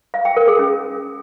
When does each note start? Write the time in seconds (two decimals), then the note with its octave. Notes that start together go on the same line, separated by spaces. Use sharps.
0.14 F5
0.25 G5
0.36 A#4
0.48 G#4
0.59 C#4